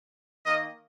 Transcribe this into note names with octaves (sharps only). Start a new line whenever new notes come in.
D#3 A#3 A#4 D#5